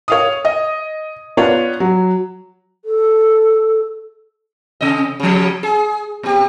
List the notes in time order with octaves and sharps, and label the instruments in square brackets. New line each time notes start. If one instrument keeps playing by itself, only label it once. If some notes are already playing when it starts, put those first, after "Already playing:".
[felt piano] C#5 F5 D#6
D#5
B3 D4 F4 C#5
F#3
[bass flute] A4
[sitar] C3 D#5
C#3 F3
G#4
A#2 G4